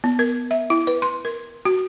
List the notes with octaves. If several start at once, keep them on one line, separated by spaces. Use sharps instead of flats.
B3
A#4
E5
E4
B4
C6
A#4
F#4